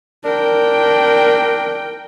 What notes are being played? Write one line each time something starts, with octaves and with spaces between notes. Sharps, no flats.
D4 A#4 G5